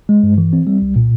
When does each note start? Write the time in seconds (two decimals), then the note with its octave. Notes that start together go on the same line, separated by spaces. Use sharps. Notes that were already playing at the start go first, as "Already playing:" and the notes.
0.09 G#3
0.23 G2
0.38 E3
0.53 C4
0.67 G3
0.82 C2
0.96 A#2